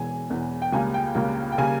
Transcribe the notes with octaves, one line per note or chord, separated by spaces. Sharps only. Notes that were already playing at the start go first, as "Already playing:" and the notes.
Already playing: E1 E2 E3 G#5
E1 E2 E3
G5
C#2 C#3 G3 A#3 G#5
G5
C#2 C#3 G3 A#3
G5
C#3 G3 A#3 G#5